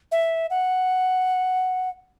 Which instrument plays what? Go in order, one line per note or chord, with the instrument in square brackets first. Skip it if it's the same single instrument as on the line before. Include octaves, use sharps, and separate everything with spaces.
[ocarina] E5
F#5